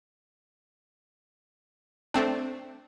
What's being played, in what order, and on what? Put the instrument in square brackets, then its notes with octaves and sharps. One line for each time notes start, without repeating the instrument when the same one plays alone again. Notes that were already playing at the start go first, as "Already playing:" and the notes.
[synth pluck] A3 C4 D4